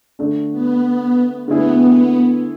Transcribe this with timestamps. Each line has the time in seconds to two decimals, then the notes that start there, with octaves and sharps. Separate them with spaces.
0.19 D3 A3 D4
0.51 B3
1.48 D3 A3 B3 E4 G#4